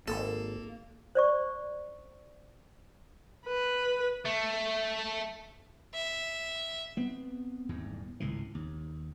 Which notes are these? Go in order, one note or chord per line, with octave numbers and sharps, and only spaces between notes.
G#1 A#3 A4
C5 D5 C#6
B4
A3
E5
B3 C4
D#1 E2 G#2
G#1 C#2 A2 E3
D#2